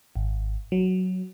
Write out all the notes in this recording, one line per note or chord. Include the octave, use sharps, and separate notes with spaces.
G#1
F#3